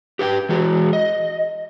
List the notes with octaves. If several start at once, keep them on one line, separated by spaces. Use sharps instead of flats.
G4 B4 F#5 G5
E3 G#3 F#4
D#5